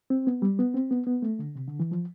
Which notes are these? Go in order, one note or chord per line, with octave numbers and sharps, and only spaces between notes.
C4
B3
G3
B3
C4
B3
B3
A3
D3
C3
D3
E3
F3